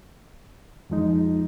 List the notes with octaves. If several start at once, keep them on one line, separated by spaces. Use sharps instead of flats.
F2 F3 G#3 D#4